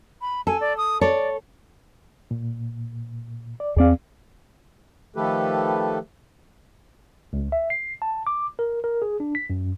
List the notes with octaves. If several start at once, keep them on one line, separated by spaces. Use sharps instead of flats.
B5
A4 G#5
D5
D#6
A4 C#5 D5
A#2
D5
E2 C4 G#4 D5 F5
D#3 F3 A3 G4 A4 B4
C#2
E5
C7
A5
D6
A#4
A#4
G#4
D4
B6
F#2